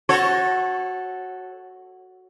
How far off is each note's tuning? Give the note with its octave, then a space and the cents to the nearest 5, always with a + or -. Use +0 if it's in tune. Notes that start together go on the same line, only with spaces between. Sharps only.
F#4 +0 A4 +0 C#5 -25